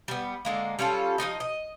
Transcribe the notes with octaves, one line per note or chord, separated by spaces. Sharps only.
G3 B3
D3 G#3 A#3
G3 C#4 F4 A4
F3 C#4 D#4 D#5
D#5